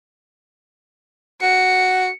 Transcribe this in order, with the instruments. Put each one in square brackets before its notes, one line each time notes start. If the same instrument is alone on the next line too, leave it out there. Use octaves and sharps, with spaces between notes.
[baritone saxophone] F#4 [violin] C#7